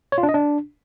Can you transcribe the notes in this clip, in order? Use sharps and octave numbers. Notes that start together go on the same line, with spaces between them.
C#5
F4
D4
D#5
D4